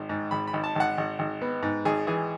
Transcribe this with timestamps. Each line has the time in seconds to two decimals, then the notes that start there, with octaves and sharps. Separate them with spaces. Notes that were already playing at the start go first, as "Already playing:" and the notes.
Already playing: G#1
0.09 G#2
0.31 G#1 B5
0.47 B5
0.53 G#1
0.64 A5
0.75 G#1 F#5
0.98 G#1
1.19 G#1
1.42 B3
1.63 G#2
1.85 G#1 G#4
2.07 E3 G#4